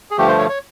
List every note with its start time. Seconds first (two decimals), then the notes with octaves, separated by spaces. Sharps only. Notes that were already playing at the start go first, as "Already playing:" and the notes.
0.11 G#4
0.18 G2 D3 F3 A3 G4
0.28 C5
0.39 C#5
0.49 C#5